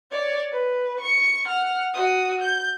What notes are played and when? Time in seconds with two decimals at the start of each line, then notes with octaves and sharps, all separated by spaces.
0.11 C#5 D5
0.51 B4
1.00 C#6 C#7
1.48 F#5 F6
1.94 F#4 D#6
2.41 G6